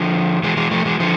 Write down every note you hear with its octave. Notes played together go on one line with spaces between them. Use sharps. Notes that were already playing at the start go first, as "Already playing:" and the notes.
Already playing: D3 F3
E3 G#3
E3 G#3
F3 A3
E3 G#3
D3 F3